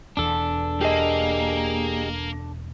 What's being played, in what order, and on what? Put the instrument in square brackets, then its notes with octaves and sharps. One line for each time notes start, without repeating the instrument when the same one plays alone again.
[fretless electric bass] E1 E2 E3 [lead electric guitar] D4 A4
[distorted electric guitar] A#3 [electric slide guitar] G4 G#4 D#5